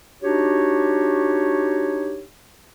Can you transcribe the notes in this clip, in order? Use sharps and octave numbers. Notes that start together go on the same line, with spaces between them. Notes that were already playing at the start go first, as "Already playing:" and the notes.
D4 D#4 F#4 G4 C#5